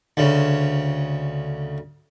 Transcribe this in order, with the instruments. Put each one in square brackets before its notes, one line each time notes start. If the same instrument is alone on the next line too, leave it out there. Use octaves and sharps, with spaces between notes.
[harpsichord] D2 C#3